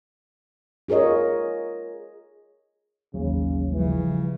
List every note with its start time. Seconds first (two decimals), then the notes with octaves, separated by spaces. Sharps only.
0.88 F4 G#4 A#4 C#5 D#5
3.14 A1 D#2 C#3 F#3
3.72 C#3 E3 F3 G3